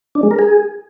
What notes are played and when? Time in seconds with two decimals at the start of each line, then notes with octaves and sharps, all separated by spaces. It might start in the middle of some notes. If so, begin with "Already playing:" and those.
0.15 D4
0.23 G#3
0.31 A#4
0.39 G#4